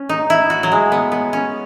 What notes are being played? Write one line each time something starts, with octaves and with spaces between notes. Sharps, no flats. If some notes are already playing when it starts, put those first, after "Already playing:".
Already playing: C#4
D#4
E4
F#4
F#3
G#3
B3
B3
C#4